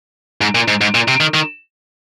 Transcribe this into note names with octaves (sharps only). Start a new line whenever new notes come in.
G#2
A#2
G#2
G#2
A#2
C3
D#3
D#3